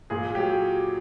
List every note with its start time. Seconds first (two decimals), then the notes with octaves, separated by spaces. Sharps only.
0.10 A#2 G#4
0.35 F#3 G4